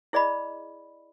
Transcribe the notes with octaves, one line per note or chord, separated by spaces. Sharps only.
E4 G#4 D5 D#5 B5